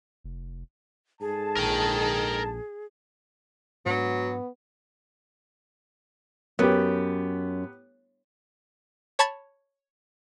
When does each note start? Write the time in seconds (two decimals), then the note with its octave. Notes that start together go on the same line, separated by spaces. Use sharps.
0.24 F1
1.21 G#2 G#4 A4 A5
1.57 A#1 A#4 G5
3.86 G#2 F#3 B3 D4
6.59 F#2 B3 G4
9.19 C#5 A5 B5 G#6 A6